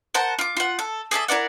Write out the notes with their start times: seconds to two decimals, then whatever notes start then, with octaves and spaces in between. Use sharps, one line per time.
0.14 A#4 C5 F#5 A5
0.39 F4 D6
0.57 F4 F#5
0.79 A4
1.11 G#4 A4 D5 E5
1.28 E4 A#4 D5 F#5